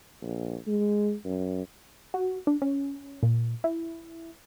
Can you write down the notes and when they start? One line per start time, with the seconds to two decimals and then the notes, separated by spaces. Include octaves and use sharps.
0.22 A#1
0.67 G#3
1.25 F#2
2.14 F#4
2.47 D4
2.62 C#4
3.23 A#2
3.64 E4